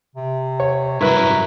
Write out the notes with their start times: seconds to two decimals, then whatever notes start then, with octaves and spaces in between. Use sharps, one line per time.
0.15 C3
0.60 C#5
1.01 G2 F#3 E4 A#4 B4